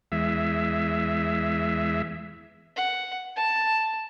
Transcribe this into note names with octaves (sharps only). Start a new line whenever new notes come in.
E2 G#3 E5
F#5
A5